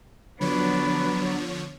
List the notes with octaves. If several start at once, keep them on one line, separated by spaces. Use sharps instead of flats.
D3 F3 F#3 B3 D4 B4 C#5